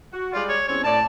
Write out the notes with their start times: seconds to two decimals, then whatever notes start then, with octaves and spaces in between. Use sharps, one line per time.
0.12 F#4
0.33 G3 G#3 F4 D5
0.49 C#5
0.68 E2 C4 C#4 C#5
0.84 A2 D5 A5